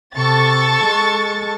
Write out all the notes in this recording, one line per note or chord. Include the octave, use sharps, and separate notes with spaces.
C3 A4 C#6 A6
G#3